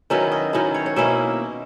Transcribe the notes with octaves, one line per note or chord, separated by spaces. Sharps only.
D#3 F#3 C#4 E4 B4
D#5
D#3 F#3 C#4 E4
C#5
C#5
B2 A#3 C#4 E4 E5